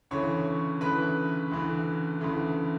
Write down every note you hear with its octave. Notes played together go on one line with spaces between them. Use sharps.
D2 C#3 E3 A3 C#5 C#6
D2 C#3 E3 A3 B4 B5
D2 C#3 E3 A3
D2 C#3 E3 A3